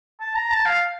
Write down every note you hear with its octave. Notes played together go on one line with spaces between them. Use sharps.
A5
A#5
A5
F5